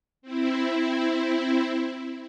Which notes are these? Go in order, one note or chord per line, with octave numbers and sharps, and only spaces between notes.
C4 E4